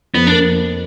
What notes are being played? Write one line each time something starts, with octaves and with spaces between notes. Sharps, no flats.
F2 B3
A#3 D4